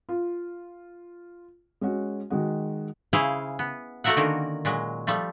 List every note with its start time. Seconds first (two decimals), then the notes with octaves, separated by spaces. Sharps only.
0.09 F4
1.81 G#3 C#4 F#4
2.30 D#3 G#3 F#4
3.13 C#3 E4 G#4 C5 F5
3.59 B3
4.04 A3 A#3 F#4 A#4 E5 F#5
4.16 D3 D#3 A#3 C#4
4.65 A#2 F#3 G#3
5.07 F3 G3 A3